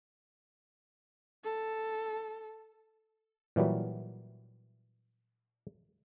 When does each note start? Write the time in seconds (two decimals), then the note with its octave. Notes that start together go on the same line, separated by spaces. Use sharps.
1.44 A4
3.56 A#2 E3 F#3 G3